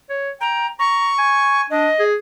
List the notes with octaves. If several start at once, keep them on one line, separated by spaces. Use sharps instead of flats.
C#5
G5 A#5
A#5 C#6
G#5
D4 D#5
G#4